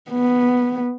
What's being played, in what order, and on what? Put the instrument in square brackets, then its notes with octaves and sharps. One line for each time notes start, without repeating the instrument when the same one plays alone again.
[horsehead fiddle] B3